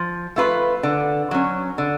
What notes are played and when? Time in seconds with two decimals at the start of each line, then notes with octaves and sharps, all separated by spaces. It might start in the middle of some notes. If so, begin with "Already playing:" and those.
Already playing: F3
0.36 A3 F4 B4
0.83 D3
1.31 F#3 C#4
1.78 D3